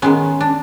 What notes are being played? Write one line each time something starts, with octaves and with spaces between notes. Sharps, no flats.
D#3 G#3 B3 C#4
D4